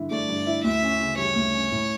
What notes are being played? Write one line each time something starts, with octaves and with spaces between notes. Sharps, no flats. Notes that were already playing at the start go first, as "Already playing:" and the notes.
Already playing: G2 D3 E4
A3 D5
G2
E4
D2 E5
C#4
C#3
G3 C#5
D2
C#4
A2